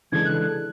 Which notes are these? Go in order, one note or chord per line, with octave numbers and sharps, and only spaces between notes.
C#3 E3 G#3 D4 A4 G#6
F#6